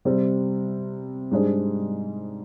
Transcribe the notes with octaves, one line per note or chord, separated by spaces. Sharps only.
C3 G3 C4
G#2 G3 D4 G#4 C5